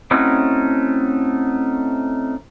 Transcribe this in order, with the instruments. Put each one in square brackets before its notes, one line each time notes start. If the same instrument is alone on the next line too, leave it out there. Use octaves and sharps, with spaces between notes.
[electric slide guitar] A3 C4 C#4 D#4 E4 F#4